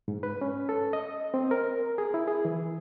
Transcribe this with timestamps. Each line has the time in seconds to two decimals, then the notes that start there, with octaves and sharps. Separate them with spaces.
0.08 G#2
0.23 B4
0.41 C#4
0.69 A4
0.93 D#5
1.34 C4
1.51 A#4
1.98 G#4
2.14 E4
2.27 G#4
2.45 E3